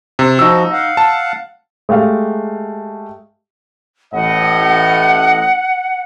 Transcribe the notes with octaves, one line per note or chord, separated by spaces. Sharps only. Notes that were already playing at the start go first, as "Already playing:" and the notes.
C3
F3 D#4 F#4 E6
F5 F#5
A5
G#3 A3 G4 F5
A1 A2 D#5 F#5